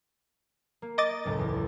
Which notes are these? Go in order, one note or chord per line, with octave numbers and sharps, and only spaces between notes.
A#3
D#5 D6 A6
F#1 C#2 A2
E2
E4